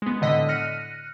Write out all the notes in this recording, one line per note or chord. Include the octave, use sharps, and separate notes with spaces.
G#3 B3
A2 D3 D#5 B6
F6 F#6 A#6 C#7 D#7